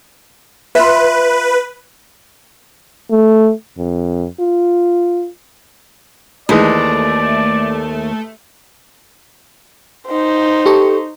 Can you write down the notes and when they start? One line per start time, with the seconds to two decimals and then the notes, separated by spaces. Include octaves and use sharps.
0.75 F4 B4 E5
3.11 A3
3.78 F2
4.40 F4
6.49 D#2 E3 G#3 A3 D#4 D5
10.07 D#4 C5
10.66 G4 A4 C#6